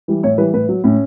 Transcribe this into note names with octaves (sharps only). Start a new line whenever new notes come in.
E3 G3
A2 C#5
E3 G3 B4
A2 B4
F#3
A2 C#4